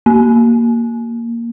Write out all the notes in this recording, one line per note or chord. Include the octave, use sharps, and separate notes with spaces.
A#3